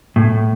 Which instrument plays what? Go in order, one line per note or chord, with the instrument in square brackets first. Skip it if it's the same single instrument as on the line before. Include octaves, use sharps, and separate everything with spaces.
[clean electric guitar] A2